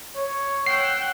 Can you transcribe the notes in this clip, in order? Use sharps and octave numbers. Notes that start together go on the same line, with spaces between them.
C#5
F#5 G5 E6 C7